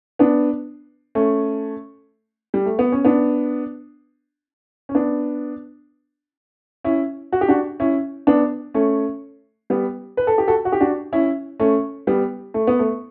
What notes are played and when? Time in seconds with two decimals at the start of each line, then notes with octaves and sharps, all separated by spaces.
0.19 B3 D4
1.15 A3 C#4
2.54 G3
2.66 A3
2.79 B3
2.92 C#4
3.05 B3 D4
4.89 C#4
4.95 B3 D4
6.84 C#4 E4
7.32 F#4
7.41 G4
7.48 D4 F#4
7.80 C#4 E4
8.27 B3 D4
8.74 A3 C#4
9.70 G3 B3
10.17 B4
10.27 A4
10.38 G4
10.48 F#4 A4
10.65 F#4
10.72 G4
10.80 D4 F#4
11.13 C#4 E4
11.60 A3 C#4
12.07 G3 B3
12.54 A3
12.67 B3
12.79 A3